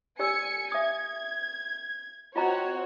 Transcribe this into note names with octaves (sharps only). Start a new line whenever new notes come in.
G4 D5 G#5 E6 C#7
E5 D#6 G#6
C4 F4 F#4 C#5 D#5 A#5